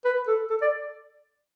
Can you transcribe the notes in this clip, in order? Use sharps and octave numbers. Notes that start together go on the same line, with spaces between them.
B4
A4
A4
D5